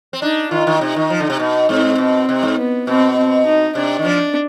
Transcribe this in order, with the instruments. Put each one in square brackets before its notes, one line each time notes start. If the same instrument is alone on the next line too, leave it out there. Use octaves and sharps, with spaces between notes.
[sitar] C4
[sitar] D4 [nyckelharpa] D#4
[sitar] D#3 [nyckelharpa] F4
[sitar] D#3
[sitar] C3 [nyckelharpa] D#4
[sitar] D#3
F3
D3
C3
B2
[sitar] G#2 [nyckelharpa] C4
[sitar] B2
C3
G#2
[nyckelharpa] B3
[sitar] B2 [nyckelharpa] C4
[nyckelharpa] C4
D#4
[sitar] C3 [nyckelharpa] D4
[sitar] D#3
[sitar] F3 [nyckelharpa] D4